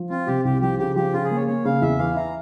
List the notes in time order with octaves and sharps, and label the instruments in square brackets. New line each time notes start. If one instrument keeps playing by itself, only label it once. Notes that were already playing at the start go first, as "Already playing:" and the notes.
Already playing: [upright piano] F3
[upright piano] C4 [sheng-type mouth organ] F4
[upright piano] C3 [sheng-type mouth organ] G4
[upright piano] C2 [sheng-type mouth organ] G4
[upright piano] F3 [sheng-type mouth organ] G4
[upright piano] C#3 [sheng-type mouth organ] G4
[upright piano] F3 [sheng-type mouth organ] G4
[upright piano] C#3 [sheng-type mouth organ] F4
[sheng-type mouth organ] G#4
[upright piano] A#3
[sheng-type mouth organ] C#5
[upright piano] A#3 [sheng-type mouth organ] C#5
[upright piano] C#3 [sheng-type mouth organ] F5
[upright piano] E2 [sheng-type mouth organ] E5
[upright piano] E3 [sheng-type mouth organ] F5
[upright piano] E4 [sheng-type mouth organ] A#5